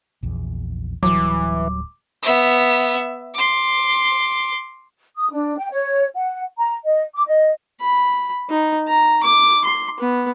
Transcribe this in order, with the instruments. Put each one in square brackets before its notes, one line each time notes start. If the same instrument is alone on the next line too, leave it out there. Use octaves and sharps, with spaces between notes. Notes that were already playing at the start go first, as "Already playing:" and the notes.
[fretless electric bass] A#1 E2
[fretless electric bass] D1 G3 [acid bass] E3 [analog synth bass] F#3 [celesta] D6
[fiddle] B3 E5
C6 D6
[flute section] D#6
D4
G5
C#5
F#5
A#5
D#5
D6
D#5
[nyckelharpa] B5
D#4
A#5
D6
C6
B3